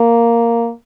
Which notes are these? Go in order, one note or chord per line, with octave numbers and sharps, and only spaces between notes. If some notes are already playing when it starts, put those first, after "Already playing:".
Already playing: A#3